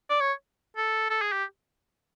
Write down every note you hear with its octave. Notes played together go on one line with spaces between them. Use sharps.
D5
C#5
A4
A4
G#4
G4